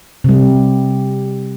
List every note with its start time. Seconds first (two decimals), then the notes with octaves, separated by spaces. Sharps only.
0.24 C3 G3